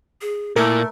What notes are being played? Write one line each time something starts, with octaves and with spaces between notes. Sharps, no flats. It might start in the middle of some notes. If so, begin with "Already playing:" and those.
G#4
A#2 A3 E4 A#4